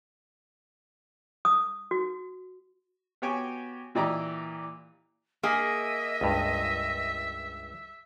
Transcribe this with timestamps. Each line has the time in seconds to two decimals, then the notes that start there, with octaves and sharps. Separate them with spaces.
1.45 D#6
1.91 F#4
3.22 B3 F#4 G4 C#5 G5 G#5
3.95 A#2 E3 G4 D5 D#5 A#5
5.43 A#3 G#4 D#5 E5
6.21 C#2 G2